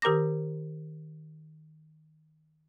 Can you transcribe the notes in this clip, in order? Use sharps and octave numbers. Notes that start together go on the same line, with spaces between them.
D#3 G4 A#4 A#5 D6 A#6